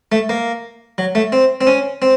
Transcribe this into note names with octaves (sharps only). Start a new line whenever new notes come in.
A3
A#3
F#3
A3
C4
C4
C#4
C4